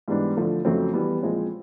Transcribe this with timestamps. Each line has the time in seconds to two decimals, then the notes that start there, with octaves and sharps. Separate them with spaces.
0.08 G#2 E3 G3 B3 D4
0.36 D3 F3 A3
0.65 F2 C#3 F#3 A3 C4
0.93 E3 G3 B3
1.23 A#2 F3 G#3 C4